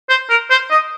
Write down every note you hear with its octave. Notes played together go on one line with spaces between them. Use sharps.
C5
A#4
C5
D#5